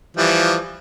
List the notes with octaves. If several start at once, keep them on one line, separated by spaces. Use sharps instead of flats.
E3 F3 G3